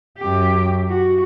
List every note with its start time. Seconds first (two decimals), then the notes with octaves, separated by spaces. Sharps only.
0.18 F#2 G4
0.89 F#4